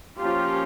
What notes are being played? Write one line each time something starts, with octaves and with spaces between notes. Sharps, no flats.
F3 A#3 C#4 F4 G4